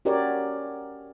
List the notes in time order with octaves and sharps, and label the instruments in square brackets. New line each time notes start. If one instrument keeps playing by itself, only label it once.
[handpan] C#4 F#4 G4 A#4 C#5 D5